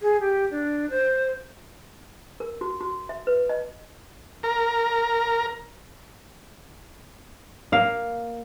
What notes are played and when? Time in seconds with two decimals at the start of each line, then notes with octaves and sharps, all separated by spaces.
0.02 G#4
0.21 G4
0.51 D4
0.90 C5
2.40 A#4
2.61 F#4
2.81 F#4
3.09 E5
3.27 B4
3.49 D#5
4.43 A#4
7.72 A#3 F5